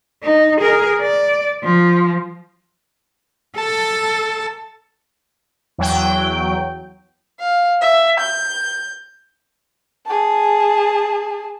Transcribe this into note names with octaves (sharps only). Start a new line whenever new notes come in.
D#4
G#4 A#4
D5
F3
A4 A5
E2 F#3 G5
F5
E5
G6
G#4 A5